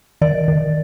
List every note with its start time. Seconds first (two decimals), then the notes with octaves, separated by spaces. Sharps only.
0.21 D#3 D5
0.48 D#3